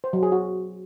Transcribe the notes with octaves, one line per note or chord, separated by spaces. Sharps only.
C5
F#3
G#4
F#4